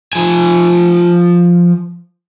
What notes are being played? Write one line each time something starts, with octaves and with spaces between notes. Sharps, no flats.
F3 G#5